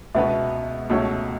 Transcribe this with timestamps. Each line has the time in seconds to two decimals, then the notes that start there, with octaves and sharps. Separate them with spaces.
0.15 C#2 B2 B3 F#4 B4 E5
0.90 C#2 B2 A3 F#4 C#5